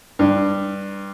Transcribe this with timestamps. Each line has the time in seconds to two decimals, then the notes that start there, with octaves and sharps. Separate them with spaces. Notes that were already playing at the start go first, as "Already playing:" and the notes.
0.19 G2